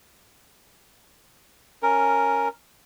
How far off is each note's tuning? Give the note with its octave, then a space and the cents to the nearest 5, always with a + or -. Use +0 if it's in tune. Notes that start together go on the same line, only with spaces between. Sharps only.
C#4 +0 A#4 +0